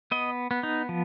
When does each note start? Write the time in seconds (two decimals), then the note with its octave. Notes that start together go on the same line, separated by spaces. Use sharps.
0.11 B3 D#5
0.51 B3
0.63 D#4
0.89 F3